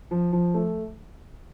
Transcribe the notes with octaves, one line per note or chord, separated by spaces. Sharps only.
F3
F3
A3